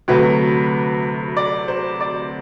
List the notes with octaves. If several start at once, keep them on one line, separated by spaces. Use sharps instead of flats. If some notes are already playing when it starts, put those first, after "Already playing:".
D2 C3 F#3 A3 B4
D5
C5
D5